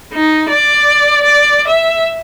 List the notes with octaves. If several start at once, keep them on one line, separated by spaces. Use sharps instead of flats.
D#4
D5
D5
E5